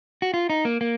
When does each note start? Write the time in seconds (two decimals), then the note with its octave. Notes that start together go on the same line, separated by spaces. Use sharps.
0.22 F#4
0.34 F4
0.50 D#4
0.65 A#3
0.81 A#3